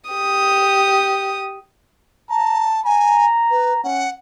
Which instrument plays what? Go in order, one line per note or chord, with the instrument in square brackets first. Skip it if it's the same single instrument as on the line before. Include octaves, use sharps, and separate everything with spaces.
[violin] G4 D#6
[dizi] A5 [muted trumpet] A#5
[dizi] G#5 [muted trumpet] A#5
[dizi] B4
[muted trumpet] C#4 [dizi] F#5